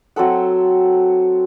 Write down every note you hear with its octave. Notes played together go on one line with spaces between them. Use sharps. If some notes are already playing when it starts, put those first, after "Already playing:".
F#3 C4 A4 F#5